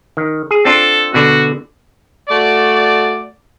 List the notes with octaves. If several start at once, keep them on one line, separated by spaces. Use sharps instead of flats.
D#3
G#4
C4 D4 F4 A4
B2 D3 F#4
A3 F#4 D5